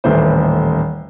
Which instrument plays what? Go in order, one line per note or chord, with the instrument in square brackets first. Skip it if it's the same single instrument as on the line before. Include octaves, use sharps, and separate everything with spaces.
[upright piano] D#1 A2 E3 C5